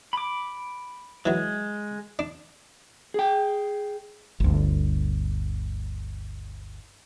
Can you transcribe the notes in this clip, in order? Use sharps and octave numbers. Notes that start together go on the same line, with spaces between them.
B5 D6
E3 F#3 G#3
D4
G#4 G5
G1 D2